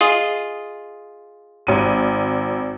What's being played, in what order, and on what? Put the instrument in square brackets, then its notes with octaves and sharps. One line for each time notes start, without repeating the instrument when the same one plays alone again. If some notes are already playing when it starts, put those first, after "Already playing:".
[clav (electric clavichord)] F4 G#4 D#5
[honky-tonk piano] G#1 D#7